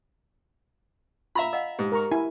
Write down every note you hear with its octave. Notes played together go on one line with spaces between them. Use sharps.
F4 E5 F5 A#5 B5
D#5 F5 F#5 E6
G#2 G4
A#4 A#5 C#6
E4 G#5